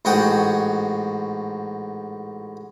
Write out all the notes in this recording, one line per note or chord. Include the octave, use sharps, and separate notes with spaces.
A1 G#2 F#4 F#5 G5 D#6